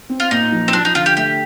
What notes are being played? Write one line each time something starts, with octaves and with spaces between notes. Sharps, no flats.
C4
F4
A#2 D#4
F3
C4
F3 D4
D#4
D3 F4
G4
A3 G4